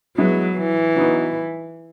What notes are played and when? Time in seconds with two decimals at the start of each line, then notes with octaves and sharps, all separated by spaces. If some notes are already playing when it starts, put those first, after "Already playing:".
0.18 F#3 G#3 B3 E4
0.57 E3
0.96 F#3 B3 D#4